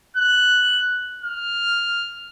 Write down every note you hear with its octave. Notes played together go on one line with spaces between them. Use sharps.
F#6
F6